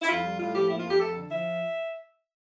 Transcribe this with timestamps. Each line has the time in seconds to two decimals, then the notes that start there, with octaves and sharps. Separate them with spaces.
0.02 E4
0.08 F2 F4
0.23 G3
0.39 A2 F4
0.54 F3 G4
0.69 A#3 E4
0.79 F2 F4
0.89 G4
1.00 F2 A4
1.15 D3
1.30 F3 E5